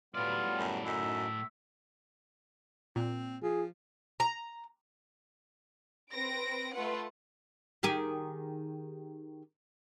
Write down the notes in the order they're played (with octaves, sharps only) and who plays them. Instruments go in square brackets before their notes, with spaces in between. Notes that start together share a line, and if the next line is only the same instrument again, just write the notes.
[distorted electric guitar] A2 D5 [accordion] F#3 G3 B3 [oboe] F4
[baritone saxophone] F#2
[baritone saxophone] F#2 [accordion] D#4 [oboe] E5
[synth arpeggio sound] A#2 [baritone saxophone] C4
[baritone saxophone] F3 [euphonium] F4 [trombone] G#4
[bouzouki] A#5
[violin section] C4 B4 A#6 D7
A3 F4 B4 F#5
[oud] D#3 G4 G#4